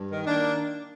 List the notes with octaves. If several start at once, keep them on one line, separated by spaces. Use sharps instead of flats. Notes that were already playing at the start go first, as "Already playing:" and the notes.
Already playing: G2
D#3
D#3 A#3 D4